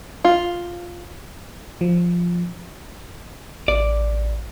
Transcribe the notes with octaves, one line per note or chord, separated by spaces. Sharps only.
F4
F3
A1 D5